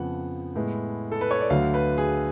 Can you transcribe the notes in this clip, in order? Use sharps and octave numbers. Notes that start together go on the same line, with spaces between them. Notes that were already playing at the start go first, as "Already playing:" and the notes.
Already playing: F2 C#3 F3 B3 F#5
A2 G#3 B3
A4
B4
C#5
D5
D2 D3 F#3 F5
B4
G#4